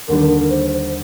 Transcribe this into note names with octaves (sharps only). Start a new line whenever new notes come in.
D#2 D3 G3 A#4
C5